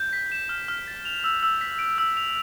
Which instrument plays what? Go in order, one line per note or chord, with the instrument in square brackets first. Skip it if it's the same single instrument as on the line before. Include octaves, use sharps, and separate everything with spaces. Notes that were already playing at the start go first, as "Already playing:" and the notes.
Already playing: [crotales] G6
B6
E7
F6
F6
A6
F7
E6
E6
B6
D7
E6
F7